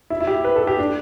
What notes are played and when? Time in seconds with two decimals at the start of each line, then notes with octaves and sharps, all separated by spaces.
0.10 E4
0.20 E4
0.27 G4
0.44 B4
0.56 A4
0.67 G4
0.79 D4